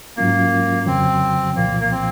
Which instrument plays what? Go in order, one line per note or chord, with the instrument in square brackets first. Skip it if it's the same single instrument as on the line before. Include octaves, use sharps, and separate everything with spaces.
[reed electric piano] G#2 F#3 C#4 F4 [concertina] A#3
[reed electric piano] F2 C#3 F#3 [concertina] C4
[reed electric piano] C2 A#2 F3 [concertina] A#3
[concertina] A#3
C4